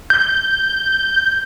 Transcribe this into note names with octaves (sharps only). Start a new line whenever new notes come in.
G6